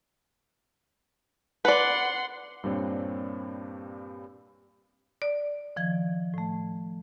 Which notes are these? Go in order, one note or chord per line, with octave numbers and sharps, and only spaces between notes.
B4 D5 F#5 C6
G2 A#2 G3 C4 D4 C#5
D5
D#3 F3 G#6
A2 A3